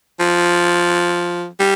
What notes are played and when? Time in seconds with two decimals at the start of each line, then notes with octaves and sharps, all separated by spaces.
0.19 F3
1.60 G3